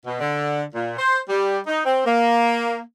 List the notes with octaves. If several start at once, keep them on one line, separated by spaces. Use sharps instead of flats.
B2
D3
A#2
C5
G3
D#4
C4
A#3